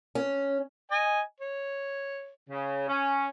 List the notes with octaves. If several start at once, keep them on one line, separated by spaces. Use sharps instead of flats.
C#4
D#5 G#5
C#5
C#3
C#4